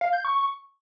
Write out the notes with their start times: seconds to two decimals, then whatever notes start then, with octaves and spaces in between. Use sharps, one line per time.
0.01 F5
0.13 G6
0.25 C#6